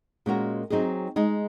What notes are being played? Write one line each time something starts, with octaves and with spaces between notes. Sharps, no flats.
A#2 G#3 C#4 F#4 A#4
F#3 C4 D#4 G#4
G#3 D#4 G#4